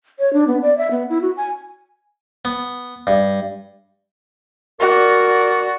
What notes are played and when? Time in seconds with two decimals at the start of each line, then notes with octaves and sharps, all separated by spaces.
0.19 C#5
0.33 D4
0.47 B3
0.62 D5
0.78 E5
0.91 B3
1.10 E4
1.21 F#4
1.37 G#5
2.45 B3
3.07 G2
4.80 F#4 A#4 D5